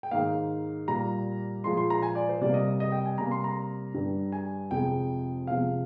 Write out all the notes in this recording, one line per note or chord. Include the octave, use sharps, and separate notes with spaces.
G5
G#2 D#3 A#3 F5
A#2 G3 A#3 A#5
A#2 F3 G#3 C6
C6
A#5
G#5
D5
C5
C3 G3 A#3 D5
D#5
D#5
G5
G#5
C3 G3 A#3 A#5
C6
A#5
G2 D3 G3
G#5
F2 C3 F3 G#3 G5
C3 F3 G#3 F5